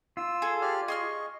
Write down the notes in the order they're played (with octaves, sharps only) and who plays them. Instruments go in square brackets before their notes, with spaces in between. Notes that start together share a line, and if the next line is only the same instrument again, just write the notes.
[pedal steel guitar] F4 [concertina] E6
[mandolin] G#4 A4
[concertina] G4 D5 F6
[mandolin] G#4 C6 F6 [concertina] D#5 C#6